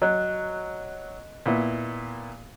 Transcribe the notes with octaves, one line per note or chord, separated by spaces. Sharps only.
F#3 D#5 F#6
A#2 B3 E4